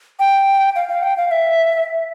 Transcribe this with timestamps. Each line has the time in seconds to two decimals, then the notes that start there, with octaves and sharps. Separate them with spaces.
0.19 G5
0.76 F5
0.89 F5
1.03 G5
1.17 F5
1.31 E5